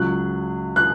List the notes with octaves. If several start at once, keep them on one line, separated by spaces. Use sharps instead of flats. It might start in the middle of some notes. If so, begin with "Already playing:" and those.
Already playing: C#2 C#3 F#3 F#6
F#6